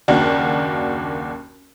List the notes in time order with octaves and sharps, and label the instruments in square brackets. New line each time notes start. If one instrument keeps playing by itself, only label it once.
[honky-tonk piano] F#1 D#2 A#3 D4 F#4